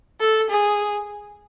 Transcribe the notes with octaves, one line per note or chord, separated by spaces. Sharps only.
A4
G#4